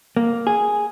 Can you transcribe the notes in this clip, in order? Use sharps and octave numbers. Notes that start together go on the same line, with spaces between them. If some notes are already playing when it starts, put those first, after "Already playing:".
A#3
G#4